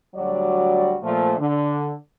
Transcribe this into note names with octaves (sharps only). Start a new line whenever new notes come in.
D2 F#3 G3 F#4 D5
A#2 F3 A3
D3